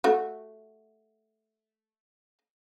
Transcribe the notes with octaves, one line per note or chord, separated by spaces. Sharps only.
A3 F#4